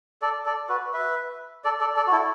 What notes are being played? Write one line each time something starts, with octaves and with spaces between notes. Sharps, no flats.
A4 D5
A4 D5
F#4 B4
B4 E5
A4 D5
A4 D5
A4 D5
F#4
E4 A4